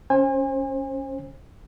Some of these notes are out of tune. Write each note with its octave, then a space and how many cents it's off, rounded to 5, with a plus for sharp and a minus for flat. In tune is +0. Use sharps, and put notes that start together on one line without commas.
C#4 +0 C5 +30 G#5 -35